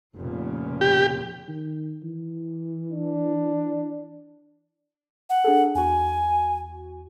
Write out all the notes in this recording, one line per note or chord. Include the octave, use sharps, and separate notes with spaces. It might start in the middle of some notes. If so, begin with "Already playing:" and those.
F1 A#2 C#3
G4
D#3
E3
D4
F#5
D4 G#4 A4
E2 F#4 G#5